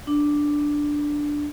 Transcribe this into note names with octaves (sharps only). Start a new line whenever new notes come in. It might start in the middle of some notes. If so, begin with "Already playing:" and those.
D4